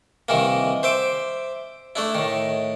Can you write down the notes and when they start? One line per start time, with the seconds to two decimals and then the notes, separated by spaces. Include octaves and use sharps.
0.29 C2 D#3 E3 A#3
0.83 C5 E5 D6
1.96 A3 D4 E4
2.15 A2 D#3